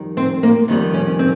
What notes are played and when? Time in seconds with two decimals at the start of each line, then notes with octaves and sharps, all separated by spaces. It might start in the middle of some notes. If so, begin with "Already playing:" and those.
Already playing: F2 D#3 G3
0.17 C4
0.43 A#3
0.68 F2 D#3 G3
0.94 C#4
1.19 C4